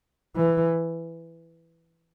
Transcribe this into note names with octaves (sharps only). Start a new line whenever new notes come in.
E3